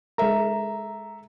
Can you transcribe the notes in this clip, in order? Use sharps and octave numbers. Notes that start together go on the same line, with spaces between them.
G#3 A4 A#4 E5 A#5